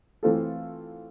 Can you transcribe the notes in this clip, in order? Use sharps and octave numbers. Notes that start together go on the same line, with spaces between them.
E3 A3 C4 F4 A4